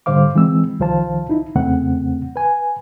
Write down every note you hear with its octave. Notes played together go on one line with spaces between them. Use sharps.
G#2 D3 G3 C5 F5 D6
E3 G#3 C4 E6
C2 D#3 F3 C5 F5 A5
D#4 E4
E2 C#3 A3 C4 F#5
B4 G#5